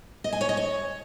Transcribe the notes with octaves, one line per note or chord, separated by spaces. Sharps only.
D#5
G#5
C#5
D#5
C#5